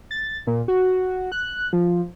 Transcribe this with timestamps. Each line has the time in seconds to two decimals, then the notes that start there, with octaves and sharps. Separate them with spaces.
0.11 A6
0.47 A#2
0.68 F#4
1.32 F#6
1.73 F3